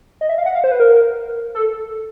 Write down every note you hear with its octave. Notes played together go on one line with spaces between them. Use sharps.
D#5
E5
F5
F#5
F5
C5
B4
A#4
A4